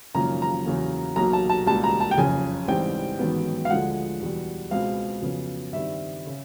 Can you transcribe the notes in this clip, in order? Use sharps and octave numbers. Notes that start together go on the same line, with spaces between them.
G#1 F#2 C#3 F3 A#3 A#5
A#5
E2 C#3 F#3 A#3
B1 B2 F#3 A#3 A#5
A5
A5
C#2 B2 G3 A#3 A5
A#5
A5
G5
F#1 F2 C#3 G#5
A1 G#2 E3 G3 C4 G5
A1 G#2 D#3 F#3 B3
F5
D2 D3 F3 G#3 F#5
E2 B2 G3
C#2 B2 G#3 C4 F5
F2 C#3 F#3 B3
G2 D#3 G3 C4 E5
C#3